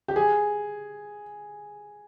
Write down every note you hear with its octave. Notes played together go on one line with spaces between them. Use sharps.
G4
G#4